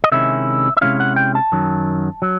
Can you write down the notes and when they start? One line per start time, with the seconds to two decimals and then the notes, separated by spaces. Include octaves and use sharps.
0.04 D#5
0.12 C3 D#3 G#3 C#4 E4 E5
0.77 E5
0.81 C3 D#3 G#3 C#4 E4 F5
1.00 F#5
1.16 G5
1.35 A5
1.52 F#2 D#3 F#3
2.22 F#3